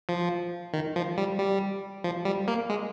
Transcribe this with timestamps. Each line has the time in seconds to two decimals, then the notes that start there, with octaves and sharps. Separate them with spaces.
0.09 F3
0.73 D#3
0.96 F3
1.18 G3
1.39 G3
2.04 F3
2.25 G3
2.48 A#3
2.70 G#3